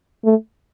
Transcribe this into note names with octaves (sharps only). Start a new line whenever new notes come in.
A3